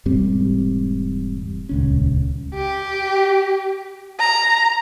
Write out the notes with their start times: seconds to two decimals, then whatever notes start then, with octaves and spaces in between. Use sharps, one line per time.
0.06 E1 G#2 G3 C4
1.69 D#1 C#2 C#4
2.55 G4
4.19 A#5